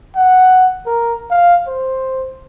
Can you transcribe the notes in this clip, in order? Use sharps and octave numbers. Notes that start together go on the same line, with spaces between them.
F#5
A#4
F5
C5